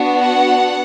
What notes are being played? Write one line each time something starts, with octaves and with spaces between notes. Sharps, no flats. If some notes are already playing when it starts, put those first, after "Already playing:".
Already playing: B3 D4 F#4
F#5